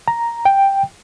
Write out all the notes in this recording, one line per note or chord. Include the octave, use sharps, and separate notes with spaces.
A#5
G5